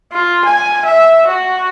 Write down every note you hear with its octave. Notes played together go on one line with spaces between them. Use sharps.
F4
G#5
E5
F#4